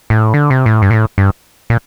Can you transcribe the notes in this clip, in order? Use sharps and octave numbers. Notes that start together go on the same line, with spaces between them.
A2
D3
C3
A2
G2
A#2
A2
G2
A#2